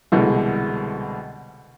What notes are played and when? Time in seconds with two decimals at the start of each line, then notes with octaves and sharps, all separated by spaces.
0.12 C2 B2 D3 E3 G#3